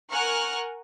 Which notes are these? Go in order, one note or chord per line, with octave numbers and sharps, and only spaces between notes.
A#4 F#5 G#5 C#6 F6 F#6